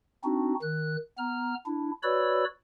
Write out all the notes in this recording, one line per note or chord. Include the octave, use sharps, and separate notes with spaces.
C4 D4 D#4 F#4
D#3 F#6
B3 A#5 F6
D4 E4
F#4 B4 C#5 D5 B5 E6